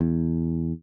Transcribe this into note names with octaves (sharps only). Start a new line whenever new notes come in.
E2